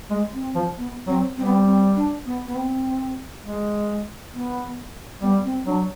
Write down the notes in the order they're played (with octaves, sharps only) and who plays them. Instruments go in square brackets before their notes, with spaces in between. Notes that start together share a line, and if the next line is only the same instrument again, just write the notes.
[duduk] G#3
[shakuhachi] C4
[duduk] F3
[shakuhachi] B3
[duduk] F#3 [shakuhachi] C4
[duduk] G3 [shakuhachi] C4
[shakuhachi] B3
C4
C4
D4
B3
B3
C4
[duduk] G#3
[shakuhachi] B3
[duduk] G3 [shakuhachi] B3
[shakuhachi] C4
[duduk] F#3 [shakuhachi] D4